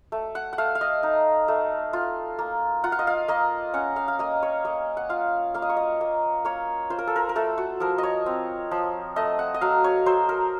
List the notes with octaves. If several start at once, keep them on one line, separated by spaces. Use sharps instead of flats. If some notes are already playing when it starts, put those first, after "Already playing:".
A3
F#5
F#5
A3 F5
F5
D#5
D#4
A3
F4
A#3
F4 F#5
F5
D#5
F5
A#3 D#5
C#4 F#5
F5
F5
A#3 D#5
C#5
A#3 D#5
F#5
F4 F5
A#3 F5
D#5
C#5
D#5
A#3
A#3 C#5
F4 C5
A#4
A4
A#4
A#4
A3 A4
F#4
F3 A#4
C#5 D#5
C4
F3
A3 D#5
F#5
D#5
F#3 F5
C#5
F#3 C5
A#4